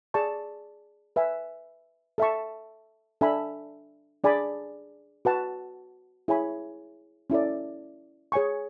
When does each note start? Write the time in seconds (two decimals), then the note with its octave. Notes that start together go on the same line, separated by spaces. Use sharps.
0.14 G#4 D5 A5 C#6
1.16 B4 E5 G#5
2.18 A4 E5 A5 C#6
3.21 D4 A4 E5 G#5 B5
4.24 D4 G#4 D5 G#5 B5
5.25 F#4 B4 F#5 A5
6.28 E4 G#4 C#5 G#5 B5
7.30 C#4 E4 A4 D5
8.32 G#4 C#5 G#5 C#6